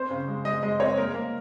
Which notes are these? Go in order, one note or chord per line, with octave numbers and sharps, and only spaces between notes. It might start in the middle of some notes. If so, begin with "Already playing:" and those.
Already playing: C4 C5
C#3
G#3
G#3 D#5
G#3 D#5
C4 C#5
A#3 A#4
A#3